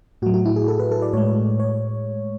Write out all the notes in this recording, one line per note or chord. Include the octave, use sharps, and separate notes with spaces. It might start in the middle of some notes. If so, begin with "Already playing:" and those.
A2 F#3 F#4
F#4
E4
G#4
A4
B4
A4
D5
A2 G#3 C#5
C#5